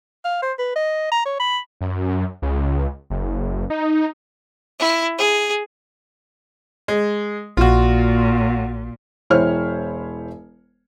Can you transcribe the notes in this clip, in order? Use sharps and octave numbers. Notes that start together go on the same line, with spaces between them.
F5
C5
B4
D#5
A#5
C#5
B5
F#2
C#2
F#1
D#4
E4
G#4
G#3
A#1 A#2 F4 F#4
E1 E4 C5 C#5 F6